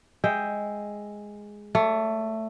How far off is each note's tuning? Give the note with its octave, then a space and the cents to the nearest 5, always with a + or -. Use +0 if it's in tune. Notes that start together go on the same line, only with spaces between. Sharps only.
G#3 +0 E5 +0 G5 +0
A3 +10 D5 -45